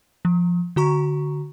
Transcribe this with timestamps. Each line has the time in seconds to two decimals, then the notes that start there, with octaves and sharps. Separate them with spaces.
0.25 F3
0.76 D3 F#4 A#5 C#6